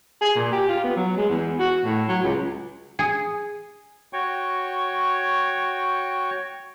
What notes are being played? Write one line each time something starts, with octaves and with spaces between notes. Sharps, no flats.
G#4
A#2
G4
F4
B3
F#3
G#3
E2
F#4
A2
F#3
C#2
G#4
F#4 C#5 G5 C#6